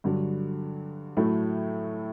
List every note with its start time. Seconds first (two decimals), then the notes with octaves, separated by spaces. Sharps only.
0.04 G2 D3 F#3
1.17 A2 F#3 A3 E4